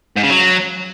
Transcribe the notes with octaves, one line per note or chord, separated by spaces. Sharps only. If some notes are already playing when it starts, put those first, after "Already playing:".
G#2
C#3
F#3